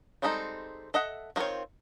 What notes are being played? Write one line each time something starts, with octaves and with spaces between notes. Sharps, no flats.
G3 G#3 C4 D#4 A4
A4 D#5 E5 F#5
D#3 A#3 C4 F4 C#5